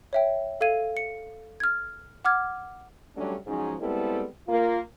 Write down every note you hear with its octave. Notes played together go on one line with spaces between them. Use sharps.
C#5 E5 G5
A4 F5 G#6 D#7
C#7
F6 G#6
F#5 D6 F6 G#6
F#3 G3 A3 C#4 D4
G#2 F3 F#3 G#3 C#4 D#4
G3 G#3 B3 C4 E4 A4
A#3 F4